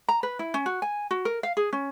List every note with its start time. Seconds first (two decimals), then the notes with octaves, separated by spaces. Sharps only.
0.08 A#5
0.23 B4
0.39 E4
0.54 C#4
0.66 F#4
0.82 G#5
1.11 F#4
1.25 A#4
1.43 F5
1.57 G#4
1.73 C#4